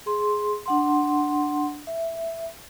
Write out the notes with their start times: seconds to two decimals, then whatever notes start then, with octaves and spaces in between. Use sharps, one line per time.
0.06 G#4 C6
0.66 D4 F#5 C6
1.87 E5